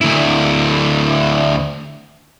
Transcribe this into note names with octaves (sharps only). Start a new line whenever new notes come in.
D2 E4